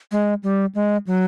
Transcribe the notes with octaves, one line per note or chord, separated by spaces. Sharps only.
G#3
G3
G#3
F#3